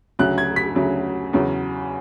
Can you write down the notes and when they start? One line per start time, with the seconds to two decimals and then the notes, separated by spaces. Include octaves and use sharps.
0.19 D2 C#3 F#3 F#6
0.38 G#6
0.56 B6
0.75 D2 C#3 F#3
1.33 E2 C#3 F#3